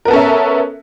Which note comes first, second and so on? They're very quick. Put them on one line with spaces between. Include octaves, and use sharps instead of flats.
A#4 B3 A4 C#4 E5